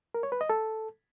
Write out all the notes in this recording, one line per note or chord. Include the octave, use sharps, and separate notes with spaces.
A#4
C#5
B4
D#5
A4